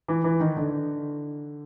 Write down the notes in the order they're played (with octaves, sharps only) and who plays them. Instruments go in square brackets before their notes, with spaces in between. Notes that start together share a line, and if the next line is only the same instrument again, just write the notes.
[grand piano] E3
E3
D#3
D3